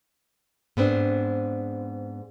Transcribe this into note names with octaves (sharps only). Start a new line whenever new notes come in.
G#2 B3 C4 D4